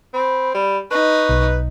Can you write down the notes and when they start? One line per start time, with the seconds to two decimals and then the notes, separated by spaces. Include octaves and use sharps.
0.14 C4 B5
0.54 G3 B5
0.91 D#4 B4 C#6
1.29 B1